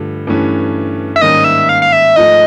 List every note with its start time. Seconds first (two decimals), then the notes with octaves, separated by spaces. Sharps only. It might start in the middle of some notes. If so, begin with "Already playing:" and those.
Already playing: G2 D3 F3 A3
0.27 G2 E3 A3 C#4
1.16 E5
1.21 G#2 D#3 G3 A#3 C#4 D#5
1.44 E5
1.69 F5
1.82 F5
1.92 E5
2.16 G#2 F3 A3 D#5